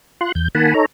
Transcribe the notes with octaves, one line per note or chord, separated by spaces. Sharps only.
F4 C6 F#6
E2 G6
D#3 A#3 F#5 G#5 A5 B5
D#4 A4 C#5 A#5